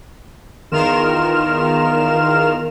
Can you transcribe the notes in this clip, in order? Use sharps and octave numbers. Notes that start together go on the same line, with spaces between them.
E2 D#3 F4 A#4 F6 E7